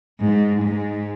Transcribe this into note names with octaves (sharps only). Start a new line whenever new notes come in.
G#2
G#2